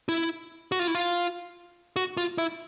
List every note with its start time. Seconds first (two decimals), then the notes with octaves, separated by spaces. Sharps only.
0.09 E4
0.72 F#4
0.79 F4
0.87 E4
0.95 F4
1.96 F#4
2.17 F4
2.38 E4